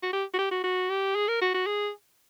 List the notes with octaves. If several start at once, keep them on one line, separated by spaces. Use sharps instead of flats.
F#4
G4
F#4
G4
F#4
F#4
G4
G#4
A#4
F#4
F#4
G#4